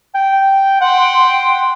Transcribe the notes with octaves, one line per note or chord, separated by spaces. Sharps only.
G5
F#5 G5 C6